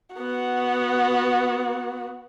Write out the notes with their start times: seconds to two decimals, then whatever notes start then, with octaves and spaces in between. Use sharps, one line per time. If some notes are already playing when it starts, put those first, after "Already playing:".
0.16 B3 F#4